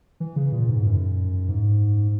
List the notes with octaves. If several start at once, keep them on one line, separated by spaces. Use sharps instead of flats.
E3
C#3
A#2
G#2
F#2
G#2